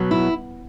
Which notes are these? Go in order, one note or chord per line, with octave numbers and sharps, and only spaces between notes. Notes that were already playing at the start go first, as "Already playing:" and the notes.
Already playing: B2 F#3 B3
E4